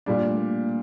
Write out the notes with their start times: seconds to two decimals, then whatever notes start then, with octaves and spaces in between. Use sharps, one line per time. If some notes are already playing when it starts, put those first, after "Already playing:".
0.06 A#2 G3 D4
0.27 A3
0.37 A#3